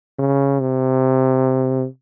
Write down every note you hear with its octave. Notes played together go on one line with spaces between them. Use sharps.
C#3
C3